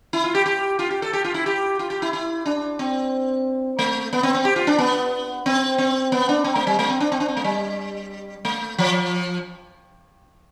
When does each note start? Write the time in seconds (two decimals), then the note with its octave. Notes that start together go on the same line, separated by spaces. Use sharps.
0.13 E4
0.24 F4
0.35 G4
0.46 G4
0.79 F4
0.90 G4
1.02 A4
1.13 G4
1.24 F4
1.34 E4
1.46 G4
1.79 F4
1.90 G4
2.02 E4
2.13 E4
2.46 D4
2.79 C4
3.79 A3
4.13 B3
4.23 C4
4.34 C4
4.45 G4
4.56 F4
4.67 D4
4.78 B3
5.46 C4
5.78 C4
6.12 B3
6.29 D4
6.44 C4
6.55 A3
6.67 G3
6.79 A3
6.89 C4
7.00 D4
7.12 C4
7.20 D4
7.28 C4
7.37 A3
7.44 G3
8.45 A3
8.78 F3